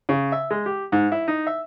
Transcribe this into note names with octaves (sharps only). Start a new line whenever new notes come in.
C#3
E5
G#3
G4
G#2
E4
D#4
E5